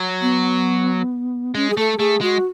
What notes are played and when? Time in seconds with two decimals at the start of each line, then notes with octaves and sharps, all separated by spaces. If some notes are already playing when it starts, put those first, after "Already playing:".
Already playing: F#3
0.22 B3
1.55 G#3 C#4
1.70 G#4
1.77 A3 A4
1.99 A3 G#4
2.21 G#3 F#4